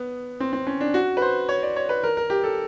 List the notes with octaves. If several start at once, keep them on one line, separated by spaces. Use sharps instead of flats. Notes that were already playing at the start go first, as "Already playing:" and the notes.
Already playing: B3
C4
C4
C#4
D4
F#4
B4
C5
C#5
D5
C#5
B4
A#4
A#4
G4
A4